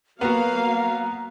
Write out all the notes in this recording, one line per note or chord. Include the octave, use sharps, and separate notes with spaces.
F#3 A#3 B3 F#4 F5 A#5